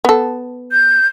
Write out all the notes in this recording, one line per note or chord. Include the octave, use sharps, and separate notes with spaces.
B3 A4
G6